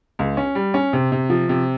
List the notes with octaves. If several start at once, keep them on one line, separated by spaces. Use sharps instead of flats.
C#2
C#4
G3
C#4
C3
C3
F3
C3